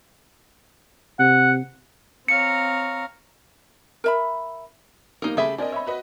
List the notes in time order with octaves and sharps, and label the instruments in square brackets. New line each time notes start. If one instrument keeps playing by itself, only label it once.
[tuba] C3 [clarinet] F#5
[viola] C4 A#5 [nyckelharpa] C#5 F5 [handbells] C#7
[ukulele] A#4 E5 B5
[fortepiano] F3 G3 A#3 [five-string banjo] D#4 A#4
[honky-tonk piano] C#3 B5 [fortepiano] A3 [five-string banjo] G4 G#4 E5
[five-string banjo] C4 [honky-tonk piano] D4 A#4 D#5 [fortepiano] D5 G#5
[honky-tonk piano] C#5 D#5 [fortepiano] E5 B5
[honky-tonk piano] F#4 B4 D#5